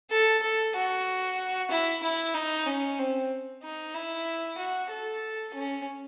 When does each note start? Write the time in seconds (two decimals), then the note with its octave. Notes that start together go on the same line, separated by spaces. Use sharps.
0.10 A4
0.43 A4
0.75 F#4
1.71 E4
2.02 E4
2.34 D#4
2.67 C#4
2.99 C4
3.63 D#4
3.94 E4
4.58 F#4
4.91 A4
5.54 C#4